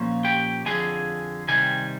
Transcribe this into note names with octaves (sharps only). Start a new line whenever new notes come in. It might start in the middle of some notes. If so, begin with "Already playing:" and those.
Already playing: A#2 F3 A#3 C#4
G4 G5
F2 D3 F3 G#4 G#5
C3 D#3 G3 G#5